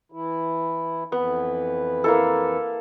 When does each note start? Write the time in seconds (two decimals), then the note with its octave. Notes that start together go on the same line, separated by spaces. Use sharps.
0.12 E3 E4
1.12 F2 E3 B3 B4
2.04 A#3 E4 A4